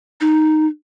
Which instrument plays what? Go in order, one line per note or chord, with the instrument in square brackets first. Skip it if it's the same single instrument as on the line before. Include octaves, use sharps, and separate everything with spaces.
[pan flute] D#4